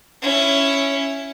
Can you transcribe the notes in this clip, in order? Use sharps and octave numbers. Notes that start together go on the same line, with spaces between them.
C#4 E4